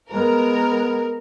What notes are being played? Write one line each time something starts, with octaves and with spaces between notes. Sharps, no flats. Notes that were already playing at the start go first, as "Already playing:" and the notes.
G#3 B3 A#4